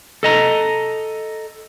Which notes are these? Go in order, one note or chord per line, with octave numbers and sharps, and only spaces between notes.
A4 D#5 A#5